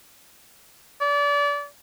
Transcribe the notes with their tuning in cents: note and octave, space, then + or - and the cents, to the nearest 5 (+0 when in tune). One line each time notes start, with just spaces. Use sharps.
D5 -30